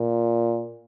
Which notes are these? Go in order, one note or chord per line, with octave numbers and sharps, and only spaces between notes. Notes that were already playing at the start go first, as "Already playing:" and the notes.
Already playing: A#2